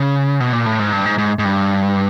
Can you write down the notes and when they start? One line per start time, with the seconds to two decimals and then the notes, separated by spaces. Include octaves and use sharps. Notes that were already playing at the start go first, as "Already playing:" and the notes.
Already playing: C#3
0.40 B2
0.53 A#2
0.66 A2
0.79 G#2
0.92 G2
1.06 G#2
1.18 G#2
1.39 G#2
1.45 G2